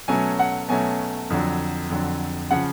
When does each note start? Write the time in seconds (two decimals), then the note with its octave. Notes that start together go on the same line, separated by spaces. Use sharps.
0.08 B2 F#3 A3 C#4 G#5
0.39 F#5
0.69 B2 F#3 A3 C#4 G#5
1.30 F2 D3 F#3
1.90 F2 D3 F#3
2.51 C#3 F3 F#5